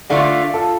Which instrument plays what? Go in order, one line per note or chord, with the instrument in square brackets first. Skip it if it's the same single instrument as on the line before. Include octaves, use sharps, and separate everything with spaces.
[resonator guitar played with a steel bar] D3 A3 D4 F4 [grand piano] D5 F5
[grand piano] F4 A4